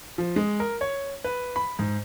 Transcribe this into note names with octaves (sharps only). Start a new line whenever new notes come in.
F3
G#3
A#4
C#5
B4
B5
G#2